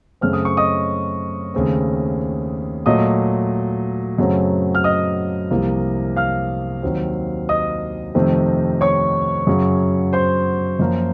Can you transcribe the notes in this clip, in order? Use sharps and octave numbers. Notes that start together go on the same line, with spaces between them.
F#2 C#3 A3 C4 F6
D#6
C#6
D#5 D#6
D#2 C#3 A3 C4
A#2 F#3 A3 D#5 D#6
F#2 C#3 F#3 A3 C4
F6
D#5 D#6
C2 C3 F3 A#3
F5 F6
D#2 D#3 F#3 C4
D#5 D#6
F2 C3 D#3 A3 C4
C#5 C#6
F#2 C#3 F#3
C5 C6
F#2 F3 A#3